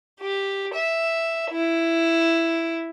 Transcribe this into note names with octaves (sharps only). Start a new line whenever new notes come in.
G4
E5
E4